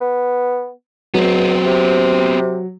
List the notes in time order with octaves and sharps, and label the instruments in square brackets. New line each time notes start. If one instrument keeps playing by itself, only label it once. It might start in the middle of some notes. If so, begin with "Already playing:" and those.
[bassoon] B3
[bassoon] C#2 [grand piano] F#3 [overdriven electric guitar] B3 C4
[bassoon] C3